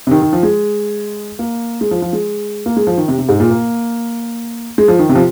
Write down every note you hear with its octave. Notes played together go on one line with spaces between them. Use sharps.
C3
D#3
D#3
F3
G#3
A#3
G#3
F3
F3
G#3
A#3
G#3
F3
D#3
C3
C3
G#2
A#2
A#3
G#3
F3
D#3
C3
F3